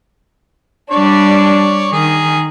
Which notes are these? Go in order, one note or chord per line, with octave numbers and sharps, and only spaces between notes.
G3 D4 C#5 D5
D#3 G#4